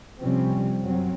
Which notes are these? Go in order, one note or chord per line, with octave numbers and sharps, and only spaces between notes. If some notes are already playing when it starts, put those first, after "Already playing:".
C3 F3 G3 C4 C#4
F#2 F#3 C4